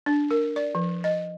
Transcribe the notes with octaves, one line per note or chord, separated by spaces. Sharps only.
D4
A#4
D5
F3
D#5